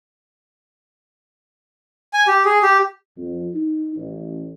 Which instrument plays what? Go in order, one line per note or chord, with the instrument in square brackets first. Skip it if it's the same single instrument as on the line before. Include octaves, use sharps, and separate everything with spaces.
[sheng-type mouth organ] G#5
G4
G#4
G4
[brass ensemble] F2
D#4
A1